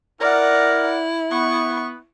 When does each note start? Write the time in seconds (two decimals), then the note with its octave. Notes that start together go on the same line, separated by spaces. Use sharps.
0.21 E4 A#4 D5 F#5
1.32 B3 C#6